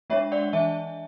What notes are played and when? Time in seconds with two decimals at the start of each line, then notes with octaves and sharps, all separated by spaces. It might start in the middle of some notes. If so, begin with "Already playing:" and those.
0.10 G#3 D4 C#5 E5
0.32 D5 F#5
0.53 E3 E5 G#5